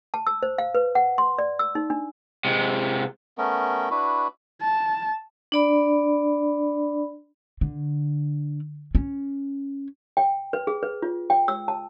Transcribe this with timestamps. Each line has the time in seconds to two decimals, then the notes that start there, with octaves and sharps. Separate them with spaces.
0.14 A5
0.27 E6
0.43 C5
0.58 F5
0.75 B4
0.95 F#5
1.18 C6
1.39 D5
1.59 E6
1.75 D#4
1.90 D4
2.45 C3 G#3
3.38 A3 B3 C#4 A#4
3.90 D4 E4 F#4 B4
4.61 A5
5.52 D4 D5 B5
7.61 D3
8.95 C#4
10.17 G5
10.53 B4
10.67 G#4
10.83 B4
11.02 F4
11.30 G5
11.48 E6
11.68 A5